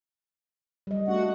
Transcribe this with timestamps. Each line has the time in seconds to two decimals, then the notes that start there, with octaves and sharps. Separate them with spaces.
0.87 G3 D#5
1.08 A3 D4 F#4 F#5